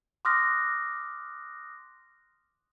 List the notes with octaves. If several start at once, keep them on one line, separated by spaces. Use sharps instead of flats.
C6 D6 D#6 F6 F#6 A#6